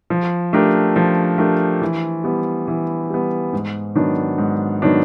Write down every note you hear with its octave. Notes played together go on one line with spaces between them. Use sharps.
F3
A3 D4 G4 A#4
F3
A3 D4 G4 A#4
E3
G3 B3
E3
G3 B3
G#2
D#3 F#3 B3 D4
G#2
D#3 F#3 B3 D4